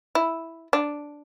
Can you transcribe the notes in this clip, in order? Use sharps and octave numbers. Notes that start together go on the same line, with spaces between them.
E4
D4